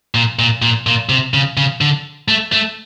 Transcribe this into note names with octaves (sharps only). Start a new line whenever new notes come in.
A#2
A#2
A#2
A#2
C3
C#3
C#3
D3
A3
A3